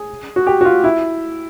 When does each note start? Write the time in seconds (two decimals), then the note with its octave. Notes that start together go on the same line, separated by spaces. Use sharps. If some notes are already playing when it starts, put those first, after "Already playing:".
Already playing: G#4
0.36 F#4
0.47 G4
0.61 F#4
0.65 F4
0.84 E4